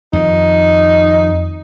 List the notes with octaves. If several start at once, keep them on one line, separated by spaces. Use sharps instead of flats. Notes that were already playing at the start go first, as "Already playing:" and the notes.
F2 D#3 D#4